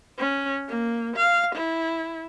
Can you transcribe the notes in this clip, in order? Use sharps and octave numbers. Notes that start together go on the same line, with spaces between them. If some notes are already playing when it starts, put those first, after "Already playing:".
C#4
A#3
F5
E4